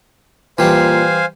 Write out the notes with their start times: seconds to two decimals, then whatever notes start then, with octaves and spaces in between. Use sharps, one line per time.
0.58 A#2 E3 G3 C5 F5 G#5